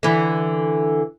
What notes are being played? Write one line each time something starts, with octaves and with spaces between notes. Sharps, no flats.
D3 E3